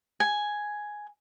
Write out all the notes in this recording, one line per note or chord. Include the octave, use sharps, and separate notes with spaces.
G#5